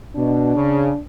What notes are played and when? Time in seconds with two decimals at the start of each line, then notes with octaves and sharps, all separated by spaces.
0.16 B2 D4
0.56 C#3